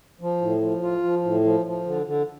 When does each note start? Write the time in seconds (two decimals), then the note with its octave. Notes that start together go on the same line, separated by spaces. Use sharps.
0.21 F3
0.41 A2
0.62 F3
0.82 F4
1.03 F3
1.24 A2
1.44 F3
1.66 F3
1.86 D3
2.06 D3